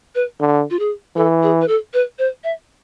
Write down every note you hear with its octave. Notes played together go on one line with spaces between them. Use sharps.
B4
D3
F4
G#4
E3 A4
G#4
B4
A4
B4
C5
E5